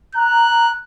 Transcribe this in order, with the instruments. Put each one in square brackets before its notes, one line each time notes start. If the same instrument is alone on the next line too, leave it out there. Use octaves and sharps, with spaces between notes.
[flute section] A#5 [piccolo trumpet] F#6